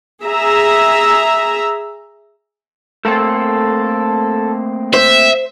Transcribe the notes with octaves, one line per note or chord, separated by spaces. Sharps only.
G#4 E5 A#5
A3 A#3 C4 A4
C5 E5